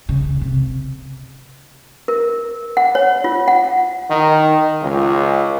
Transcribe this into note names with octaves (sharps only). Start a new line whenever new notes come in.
C#3
C3
A#4
F#5
C#5
F4
F#5
D#3
C#2